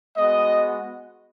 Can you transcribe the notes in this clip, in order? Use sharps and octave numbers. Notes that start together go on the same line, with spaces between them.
G#3 B3 F#4 D#5